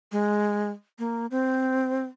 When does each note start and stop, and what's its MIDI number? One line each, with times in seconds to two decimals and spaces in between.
0.12 0.69 56
0.99 1.26 58
1.31 2.05 60